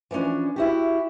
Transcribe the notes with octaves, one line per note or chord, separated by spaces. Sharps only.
E3 F3 A3 C#4 D4
E4 F#4 G4